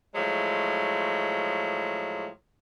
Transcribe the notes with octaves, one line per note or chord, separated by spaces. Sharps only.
A2 F3 F#3 G#3